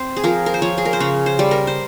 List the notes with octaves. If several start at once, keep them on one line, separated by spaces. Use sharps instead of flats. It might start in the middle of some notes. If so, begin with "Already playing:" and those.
Already playing: C4 C5
G#4
F3 A#4
A#4
C5
F3 C#5
G#4
A#4
C5
C#3 C#5
C5
G3
A#4
C5